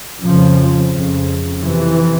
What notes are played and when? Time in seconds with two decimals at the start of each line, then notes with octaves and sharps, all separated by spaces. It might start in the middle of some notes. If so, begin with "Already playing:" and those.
0.24 F2 C#3 F3
0.93 F2 C#3
1.61 F2 C3 E3